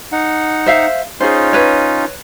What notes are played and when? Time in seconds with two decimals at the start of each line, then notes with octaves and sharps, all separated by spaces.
0.12 D#4 F#5
0.66 C5 E5 F5
1.20 C#4 D#4 F4 G#4 C5
1.53 B4 C#5